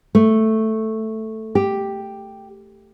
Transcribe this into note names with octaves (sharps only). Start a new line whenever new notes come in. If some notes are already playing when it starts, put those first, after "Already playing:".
A3
G4